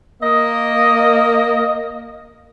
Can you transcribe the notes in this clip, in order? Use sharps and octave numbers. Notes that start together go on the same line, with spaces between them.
A#3 D#5